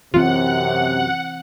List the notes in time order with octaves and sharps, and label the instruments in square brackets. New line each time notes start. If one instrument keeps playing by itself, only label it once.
[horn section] F#2 C3 [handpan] E3 C4 [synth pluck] F4 [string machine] F#5